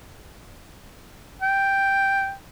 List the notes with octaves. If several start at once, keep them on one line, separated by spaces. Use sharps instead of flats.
G5